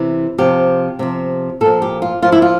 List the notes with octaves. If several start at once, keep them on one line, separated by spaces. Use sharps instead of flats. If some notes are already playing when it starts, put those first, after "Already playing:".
Already playing: C3 E3
C3 F3 G4
C3 F3
A#2 F3 A4
G4
F4
A#2 F3 F4
E4
F4